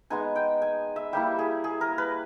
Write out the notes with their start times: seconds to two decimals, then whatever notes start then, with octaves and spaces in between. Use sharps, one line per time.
0.10 G#3 B3 D#4 G#5
0.36 G5
0.62 G#5
0.96 E5
1.13 G3 A#3 E4 G4
1.39 G#4
1.64 G#4
1.81 A#4
1.98 B4